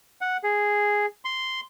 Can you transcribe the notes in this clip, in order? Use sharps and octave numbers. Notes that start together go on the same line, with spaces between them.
F#5
G#4
C6